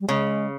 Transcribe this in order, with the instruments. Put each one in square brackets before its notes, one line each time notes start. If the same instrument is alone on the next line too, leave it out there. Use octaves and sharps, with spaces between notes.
[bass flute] G3
[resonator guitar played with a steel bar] C#3 [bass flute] G#3